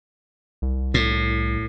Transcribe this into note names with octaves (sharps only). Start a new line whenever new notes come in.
C2
A2